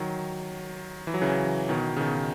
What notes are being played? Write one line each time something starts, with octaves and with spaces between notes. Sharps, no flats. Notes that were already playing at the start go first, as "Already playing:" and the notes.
Already playing: D#3 F#3
E3
F#3
C#3 E3
B2 D#3
C#3
B2 D#3